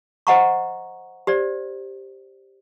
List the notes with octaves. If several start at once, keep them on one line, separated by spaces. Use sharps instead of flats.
C5 D#5 F#5 A#5 C#6
G4 C5 D5